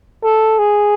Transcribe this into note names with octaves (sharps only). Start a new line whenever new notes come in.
A4
G#4